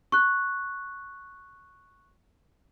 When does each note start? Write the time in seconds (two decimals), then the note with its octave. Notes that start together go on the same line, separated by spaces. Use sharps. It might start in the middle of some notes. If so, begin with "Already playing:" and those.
0.12 C#6 F#6